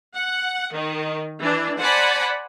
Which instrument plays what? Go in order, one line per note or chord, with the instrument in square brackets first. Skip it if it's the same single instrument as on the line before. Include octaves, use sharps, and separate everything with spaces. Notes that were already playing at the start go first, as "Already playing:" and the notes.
[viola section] F#5
D#3
E3 D4
C5 D5 F#5 G#5 A5 B5